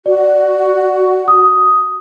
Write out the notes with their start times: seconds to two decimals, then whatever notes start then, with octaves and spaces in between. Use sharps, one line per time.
0.06 F#4 D5
1.28 D#6